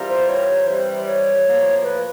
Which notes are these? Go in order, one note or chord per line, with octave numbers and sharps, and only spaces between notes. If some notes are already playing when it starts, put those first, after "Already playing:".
Already playing: E3 G3 C4 F4 A#4
C5
C#5
C3 E3 G3 C5
C#5
A2 F3 A#3
B4